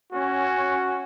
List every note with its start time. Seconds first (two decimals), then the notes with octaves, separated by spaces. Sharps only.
0.12 C#4 F#4